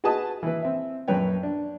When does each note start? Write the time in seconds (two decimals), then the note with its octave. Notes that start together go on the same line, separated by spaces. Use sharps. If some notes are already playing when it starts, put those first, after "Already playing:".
0.04 F#4 G#4 B4 D#5 A5 D#6
0.43 E3 B4
0.62 C4 E5
1.08 A#1 F#2 B4 C#5 G5
1.43 D4